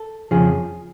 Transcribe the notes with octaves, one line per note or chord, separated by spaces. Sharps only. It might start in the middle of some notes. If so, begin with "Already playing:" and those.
Already playing: A4
F2 C#3 F3 G#4